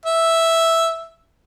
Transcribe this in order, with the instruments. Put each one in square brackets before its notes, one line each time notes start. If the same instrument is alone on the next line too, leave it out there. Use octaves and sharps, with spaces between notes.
[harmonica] E5